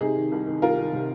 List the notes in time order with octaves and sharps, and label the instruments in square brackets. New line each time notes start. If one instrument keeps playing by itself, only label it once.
[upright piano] C3 D#4 G#4
D#3
C2
D#3
C2 F4 A#4
D#3
C3